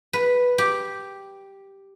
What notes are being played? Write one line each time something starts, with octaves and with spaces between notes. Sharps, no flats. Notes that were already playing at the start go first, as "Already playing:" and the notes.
B4
G4